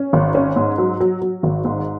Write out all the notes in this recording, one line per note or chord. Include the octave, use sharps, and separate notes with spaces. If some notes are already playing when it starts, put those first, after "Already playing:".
Already playing: C#4
G#1
C#4
G#2
F#3
F#3
F#3
G#1
G#2